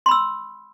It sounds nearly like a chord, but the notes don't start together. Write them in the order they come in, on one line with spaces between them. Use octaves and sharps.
C6 B5 E6